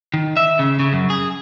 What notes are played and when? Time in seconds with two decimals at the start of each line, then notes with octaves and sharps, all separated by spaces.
0.14 D#3
0.37 E5
0.59 C#3
0.79 C#3
0.93 F#2
1.10 G#4